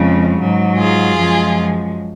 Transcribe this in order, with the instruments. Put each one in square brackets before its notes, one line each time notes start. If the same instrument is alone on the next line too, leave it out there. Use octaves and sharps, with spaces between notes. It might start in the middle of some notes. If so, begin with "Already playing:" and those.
Already playing: [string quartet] F2 C#3 G#3
G#2 F#3
F4 G#4
F#2 F3 G#3